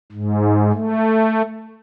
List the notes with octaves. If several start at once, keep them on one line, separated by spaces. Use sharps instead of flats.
G#2
A3